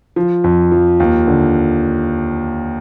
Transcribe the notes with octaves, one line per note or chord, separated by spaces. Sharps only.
F3
F2
F3
D#2
D3